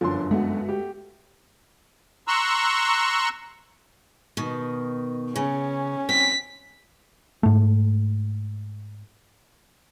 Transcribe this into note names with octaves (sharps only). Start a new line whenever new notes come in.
G1 F#2 D3 F3 C#4 C6
G#3 A3 B3 F#4
G4
A#5 C6 C#6 E6 F#6
B2 D#3
C#3 C#4
C4 B6
G#2 A3